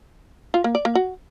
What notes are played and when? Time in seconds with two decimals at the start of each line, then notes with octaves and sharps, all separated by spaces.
0.54 F4
0.64 A#3
0.75 D5
0.85 A#3
0.95 F#4